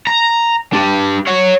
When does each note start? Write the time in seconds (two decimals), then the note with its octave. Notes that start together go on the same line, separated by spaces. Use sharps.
0.07 A#5
0.73 D4 G4
1.27 C#5 F#5